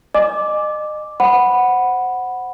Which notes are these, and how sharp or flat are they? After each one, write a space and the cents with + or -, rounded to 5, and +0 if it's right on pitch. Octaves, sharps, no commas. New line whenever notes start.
D#5 -35 G#5 +0 D6 +0
C5 +0 F#5 +0 B5 +0